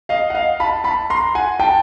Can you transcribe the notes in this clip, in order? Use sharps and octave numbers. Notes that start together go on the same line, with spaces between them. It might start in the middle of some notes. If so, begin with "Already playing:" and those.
D#5 F5
F#5
D#5 F5
A5 B5
A5 B5
A#5 C6
F#5 G#5
G5 A5